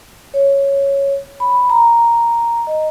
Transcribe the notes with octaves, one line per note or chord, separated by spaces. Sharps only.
C#5
B5
A#5
D#5